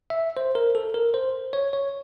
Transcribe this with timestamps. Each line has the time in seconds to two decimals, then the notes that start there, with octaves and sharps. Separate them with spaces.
0.10 E5
0.37 C5
0.55 A#4
0.75 A4
0.94 A#4
1.14 C5
1.53 C#5
1.73 C#5